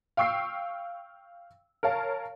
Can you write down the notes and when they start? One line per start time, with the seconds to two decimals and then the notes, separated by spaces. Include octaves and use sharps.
0.17 F5 G5 C#6 E6 C7
1.83 A#4 C#5 F5 A5